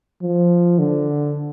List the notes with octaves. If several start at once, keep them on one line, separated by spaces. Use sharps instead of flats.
F3
D3